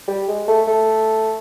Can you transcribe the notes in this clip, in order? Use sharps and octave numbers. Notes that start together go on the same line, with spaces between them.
G3
G#3
A3
A3